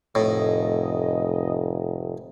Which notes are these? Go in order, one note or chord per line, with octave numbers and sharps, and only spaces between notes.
F1 A2 D#5